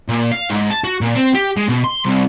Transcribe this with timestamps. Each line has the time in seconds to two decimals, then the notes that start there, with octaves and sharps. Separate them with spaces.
0.09 A#2
0.32 F5
0.50 G#2
0.70 A5
0.84 F#4
1.01 A#2
1.15 C4
1.34 G4
1.57 G#3
1.69 B2
1.84 C6
2.05 C2